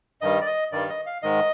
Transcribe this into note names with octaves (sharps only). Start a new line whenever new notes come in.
G2 D#3 G3 D#5
D5
D#5
G2 D#3 G3 D5
D#5
F5
G#2 D#3 G#3 D#5